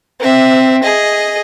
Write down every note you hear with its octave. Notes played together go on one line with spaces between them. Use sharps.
C4 E5
G#4 D#5